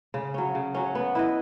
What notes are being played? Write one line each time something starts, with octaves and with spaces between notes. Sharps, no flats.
C#3
F#3 C#4
C#3
F#3 C#4
B3
E4 B4 D#5